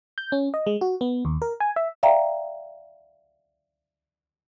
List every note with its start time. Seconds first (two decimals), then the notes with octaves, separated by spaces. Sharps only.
0.18 G6
0.32 C#4
0.54 D#5
0.67 G#3
0.81 F#4
1.01 B3
1.25 D#2
1.42 A#4
1.60 G#5
1.76 E5
2.03 D5 E5 F5 G5 A#5